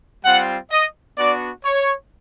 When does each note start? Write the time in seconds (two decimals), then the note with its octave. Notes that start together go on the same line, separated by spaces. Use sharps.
0.24 G3 C4 F4 F#5
0.71 D#5
1.18 B3 D4 F#4 D5
1.64 C#5